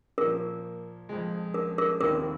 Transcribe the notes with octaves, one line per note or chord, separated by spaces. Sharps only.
A#2 F3 A#3 A#4
F2 F3 G#3
A#4
A#4
F1 D#2 D#3 C4 A#4